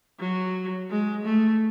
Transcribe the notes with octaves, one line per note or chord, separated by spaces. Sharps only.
F#3
G#3
A3